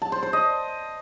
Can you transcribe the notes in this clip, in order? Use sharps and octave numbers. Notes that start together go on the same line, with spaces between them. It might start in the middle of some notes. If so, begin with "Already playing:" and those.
A5
C5
C5
D#5